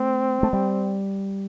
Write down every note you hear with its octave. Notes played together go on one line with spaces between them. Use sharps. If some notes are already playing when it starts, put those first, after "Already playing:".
Already playing: A3 C4
A3
G3